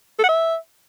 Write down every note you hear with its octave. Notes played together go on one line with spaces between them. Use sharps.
A4
F#5
E5